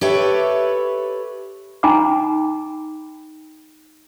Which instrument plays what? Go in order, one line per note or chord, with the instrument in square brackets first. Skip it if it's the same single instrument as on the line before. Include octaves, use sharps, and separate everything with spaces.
[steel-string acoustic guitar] G4 A4 B4 C#5 E5
[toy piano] D#4 G5 G#5 A#5 B5 D6